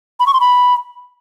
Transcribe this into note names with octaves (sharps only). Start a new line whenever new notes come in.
B5
C#6
C6
B5